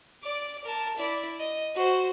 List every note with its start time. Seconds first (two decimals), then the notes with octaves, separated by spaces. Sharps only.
0.23 D5 D6
0.64 A#4 A5
0.96 E4 D5
1.39 D#5
1.75 F#4 C5